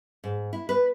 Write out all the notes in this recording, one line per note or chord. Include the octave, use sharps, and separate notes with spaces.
G#2
E4
B4